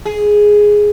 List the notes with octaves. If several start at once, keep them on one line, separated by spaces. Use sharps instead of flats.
G#4